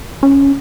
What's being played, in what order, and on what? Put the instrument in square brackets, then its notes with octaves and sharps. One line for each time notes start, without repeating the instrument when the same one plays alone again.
[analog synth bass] C#4